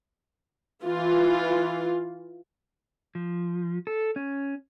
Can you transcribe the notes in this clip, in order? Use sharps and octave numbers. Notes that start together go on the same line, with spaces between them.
E3 F4
F3
A4
C#4